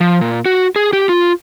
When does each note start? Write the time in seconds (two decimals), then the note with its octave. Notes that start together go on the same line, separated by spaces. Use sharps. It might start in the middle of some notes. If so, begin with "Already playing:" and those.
0.01 F3
0.21 A#2
0.46 F#4
0.76 G#4
0.93 G4
1.09 F4